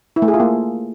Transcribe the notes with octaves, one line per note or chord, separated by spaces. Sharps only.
E4
A3
G#4
F4
A#3